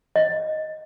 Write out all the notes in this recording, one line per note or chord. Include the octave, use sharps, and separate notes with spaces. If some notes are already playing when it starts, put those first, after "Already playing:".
D#5